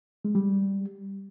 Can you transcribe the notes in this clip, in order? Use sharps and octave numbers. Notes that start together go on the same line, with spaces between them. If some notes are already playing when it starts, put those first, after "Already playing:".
G#3
G3